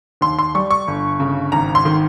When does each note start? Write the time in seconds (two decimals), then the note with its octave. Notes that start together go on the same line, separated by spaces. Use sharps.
0.21 D#2 C6
0.39 C6
0.55 G3 C#6
0.71 C#6
0.88 G1
1.20 C#3
1.52 G#1 A#5
1.75 C6
1.85 D#3